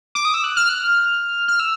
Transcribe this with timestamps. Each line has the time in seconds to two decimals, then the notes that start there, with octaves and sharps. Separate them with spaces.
0.15 D6
0.25 D#6
0.34 E6
0.44 F#6
0.57 F6
0.69 F#6
0.83 F6
1.48 F6
1.60 E6